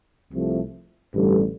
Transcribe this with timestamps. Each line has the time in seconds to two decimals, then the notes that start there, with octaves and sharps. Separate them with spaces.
0.31 C2 C3 F3 A3
1.14 A1 G2 D3 G3